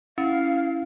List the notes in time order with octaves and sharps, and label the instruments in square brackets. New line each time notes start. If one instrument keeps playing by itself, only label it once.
[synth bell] C#4 [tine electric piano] E4 [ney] F5